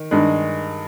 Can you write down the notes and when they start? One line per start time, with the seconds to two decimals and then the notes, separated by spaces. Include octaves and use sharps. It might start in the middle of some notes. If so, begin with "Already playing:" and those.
Already playing: D#3
0.11 G2 D#3 G#3